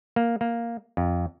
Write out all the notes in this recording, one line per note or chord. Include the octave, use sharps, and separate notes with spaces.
A#3
A#3
F2